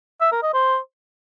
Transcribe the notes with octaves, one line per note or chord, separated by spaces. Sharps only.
E5
A#4
D#5
C5